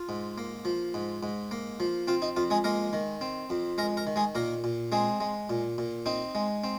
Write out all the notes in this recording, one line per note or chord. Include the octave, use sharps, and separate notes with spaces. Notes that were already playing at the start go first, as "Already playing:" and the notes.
Already playing: F4
G#2
A#3
F3
G#2
G#2
A#3
F3
C4 F4
D#4
F2 F4
G#3 G#4
G#3 A#3 A#4
D#3
C4
F2
G#3 A#4 A#5
A#4 A#5
D#3
G#3 G#4
A#2 A#3 A#4
A#2
G#3 C4 G#4
G#3
A#2
A#2
C4 D#4
G#3
C4